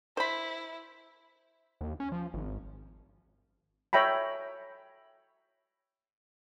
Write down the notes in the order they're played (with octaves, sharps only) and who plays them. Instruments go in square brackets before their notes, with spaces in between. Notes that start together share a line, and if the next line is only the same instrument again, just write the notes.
[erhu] E4 [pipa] C5 B5
[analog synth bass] D#2
C#4
F3
G#1
[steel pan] C#5 E5 G5 A#5 B5